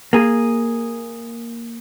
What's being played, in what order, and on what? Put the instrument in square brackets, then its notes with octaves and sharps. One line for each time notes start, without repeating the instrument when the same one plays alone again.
[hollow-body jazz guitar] A#3 G#4